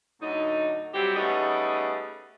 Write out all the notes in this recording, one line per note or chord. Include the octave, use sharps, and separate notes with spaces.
A2 D3 F#3 D#4
F#3 G3 C4 E4 G4
G3 A3 B3 C#4 D#4 G#4